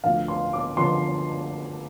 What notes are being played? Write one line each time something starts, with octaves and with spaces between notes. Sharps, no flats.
D2 D3 F3 F5
C6
D6
D3 F3 C6